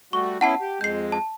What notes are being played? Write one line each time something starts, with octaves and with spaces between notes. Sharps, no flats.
G3 A3 F#4 C#6
B3 C#4 E4 F#5 A5 C7
G4
F2 G#3 G6 C7
A5